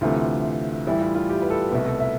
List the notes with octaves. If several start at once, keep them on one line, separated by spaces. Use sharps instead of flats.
D2 C3 E3 A3 F4
A2 E3 G3 E4
F4
F4
G4
B4
A4
C2 B2 A3 B4
A4
E5